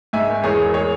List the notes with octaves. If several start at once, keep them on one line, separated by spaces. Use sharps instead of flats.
G#2 E5 G#5
G#1
E2 G#4 C#5
E1
G#4 C#5